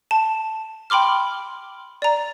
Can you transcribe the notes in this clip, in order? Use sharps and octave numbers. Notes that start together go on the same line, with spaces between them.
A5
G5 B5 C6 D6 F6
D5 A#5